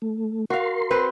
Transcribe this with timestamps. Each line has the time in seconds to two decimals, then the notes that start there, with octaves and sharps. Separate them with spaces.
0.02 A3
0.50 F#4 A#4 F5 C6
0.91 C4 B4